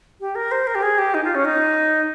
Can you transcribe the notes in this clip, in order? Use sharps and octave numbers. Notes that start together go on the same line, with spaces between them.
G4
A#4
C5
A#4
G4
G#4
G4
D#4
F4
C#4
D#4